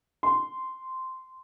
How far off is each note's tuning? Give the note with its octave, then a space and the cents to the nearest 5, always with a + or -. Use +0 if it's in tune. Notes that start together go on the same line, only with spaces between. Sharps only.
C6 -10